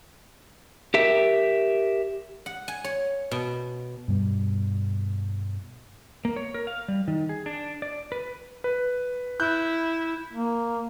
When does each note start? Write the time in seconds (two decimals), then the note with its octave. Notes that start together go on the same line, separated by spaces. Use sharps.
0.94 G4 A#4 E5
2.46 F#5
2.68 G#5
2.84 C#5
3.31 B2
4.08 G2 B2 G3
6.25 A#3
6.36 C#5
6.54 A#4
6.67 F5
6.88 G3
7.08 D#3
7.29 G#4
7.46 D4
7.82 D5
8.12 B4
8.64 B4
9.40 E4 F#6 G6
10.33 A#3